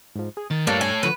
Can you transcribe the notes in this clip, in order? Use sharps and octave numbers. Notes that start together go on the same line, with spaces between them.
G#2 F3
G#4
D#3 A6
G2 A3 A#3 D4 C#5
G#5
D3 F3 F#4 B4